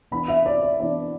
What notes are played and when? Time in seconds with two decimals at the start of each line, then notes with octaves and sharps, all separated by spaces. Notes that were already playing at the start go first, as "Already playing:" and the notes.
0.11 E3 B3 D4 B5
0.28 E5
0.46 D5
0.62 D5
0.80 E3 B3 D4 D5